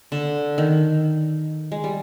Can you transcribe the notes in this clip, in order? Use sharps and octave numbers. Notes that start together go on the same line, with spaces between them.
D3
D#3
G#3
G3